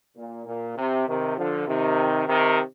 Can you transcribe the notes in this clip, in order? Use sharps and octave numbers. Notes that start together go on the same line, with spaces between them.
A#2
A#2
C3
C3 D#3
D3 F3
C3 D#3
C3 D#3